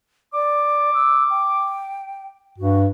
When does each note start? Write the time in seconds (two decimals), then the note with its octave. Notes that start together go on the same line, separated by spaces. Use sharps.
0.34 D5 D6
0.94 E6
1.30 G5
2.58 G2 F#4